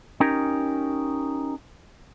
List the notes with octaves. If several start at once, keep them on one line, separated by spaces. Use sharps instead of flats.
C#4 D#4 G4 A#4